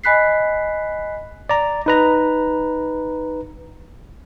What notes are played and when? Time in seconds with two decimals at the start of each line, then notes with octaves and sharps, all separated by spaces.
0.04 D#5 G#5 B5 F#6 B6 C7
1.49 D5 A#5
1.86 D#4 B4 A#5